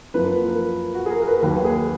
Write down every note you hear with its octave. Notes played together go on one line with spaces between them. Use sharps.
F#2 F3 A#3 B4
A#4
F#4
G#4
A#4
A#4
B4
D#2 D#3 F#3 A#3 B4
G#4